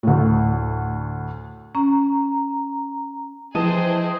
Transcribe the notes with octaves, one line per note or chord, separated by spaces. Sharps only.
D2 A2
C#4 A#5
E3 F3 G#4 C5 D#5 G5 A5 D#7